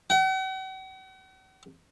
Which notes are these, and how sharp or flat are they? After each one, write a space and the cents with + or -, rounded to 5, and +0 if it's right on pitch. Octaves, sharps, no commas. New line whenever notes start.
F#5 +45